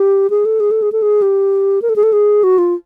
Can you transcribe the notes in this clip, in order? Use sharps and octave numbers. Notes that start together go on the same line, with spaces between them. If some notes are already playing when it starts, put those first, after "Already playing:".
Already playing: G4
G#4
A4
G#4
A4
G#4
A4
G#4
G4
A#4
A4
G#4
A4
G#4
F#4
F4